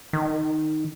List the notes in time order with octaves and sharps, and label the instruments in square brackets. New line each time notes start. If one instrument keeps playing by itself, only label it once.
[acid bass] D#3